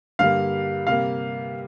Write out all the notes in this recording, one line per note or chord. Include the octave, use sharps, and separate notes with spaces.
G2 D3 G3 A#3 F5
C3 G3 A#3 F5